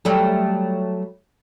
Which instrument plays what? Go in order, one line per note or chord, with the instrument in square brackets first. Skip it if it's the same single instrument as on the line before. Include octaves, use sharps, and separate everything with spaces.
[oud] F#3 G3 A3